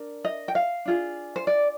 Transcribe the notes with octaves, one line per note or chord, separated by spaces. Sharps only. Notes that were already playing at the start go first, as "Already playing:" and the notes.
Already playing: D4 A#4
D#5
G5
F5
D4 F4 G#4
C5
D5